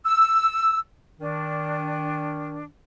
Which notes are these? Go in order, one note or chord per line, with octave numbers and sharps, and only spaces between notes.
E6
D#3 D4